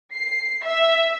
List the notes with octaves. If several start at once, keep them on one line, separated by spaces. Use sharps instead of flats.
C7
E5